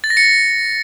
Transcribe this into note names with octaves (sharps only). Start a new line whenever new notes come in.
A6
A#6
C#7